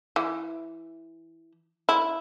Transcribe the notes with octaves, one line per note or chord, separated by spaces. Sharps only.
E3
E4